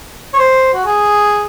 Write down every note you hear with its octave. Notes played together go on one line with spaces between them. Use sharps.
C#5
C5
F#4
G#4